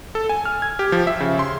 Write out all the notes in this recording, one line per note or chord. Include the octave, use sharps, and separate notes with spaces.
A4
G#5
F6
G#6
G4
F3
E5
C#3
C6